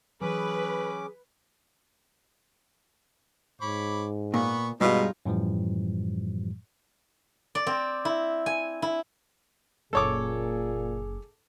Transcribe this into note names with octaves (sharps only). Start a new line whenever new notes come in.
E3 F#3 C#4 G#4 B4 D6
G#2 C#5 B5 D6
A#2 B3 B4 C#6
G2 B2 G#3 D#4 F4 C#5 D#5
F#2 A2 E3 F3 G3
D5
C4
E4
G#5
E4
F#1 A#2 G#4 A4 C#5 D6